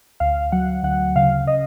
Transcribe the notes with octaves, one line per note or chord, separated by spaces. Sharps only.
D2 F5
F#3 F#5
D2 F#5
C#3 F5
D#5